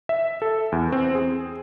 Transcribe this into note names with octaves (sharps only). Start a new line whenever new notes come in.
E5
A4
E2
C4
G#4